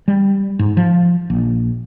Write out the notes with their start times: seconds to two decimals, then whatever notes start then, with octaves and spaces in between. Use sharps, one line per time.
0.08 G3
0.59 G#2
0.77 F3
1.30 A#1